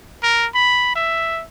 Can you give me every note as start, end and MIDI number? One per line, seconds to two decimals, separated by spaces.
0.23 0.46 70
0.55 0.91 83
0.96 1.43 76